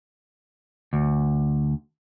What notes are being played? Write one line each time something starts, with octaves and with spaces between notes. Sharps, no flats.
D2